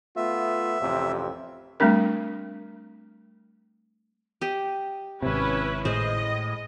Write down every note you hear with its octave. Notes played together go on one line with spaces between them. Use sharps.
A3 B3 F4 E5
A1 F2 C3
G3 A3 C4 D4 A#4
G4 D#5
G#1 C3 C#4 E4 B4
A2 G#3 G#4 C5 D#5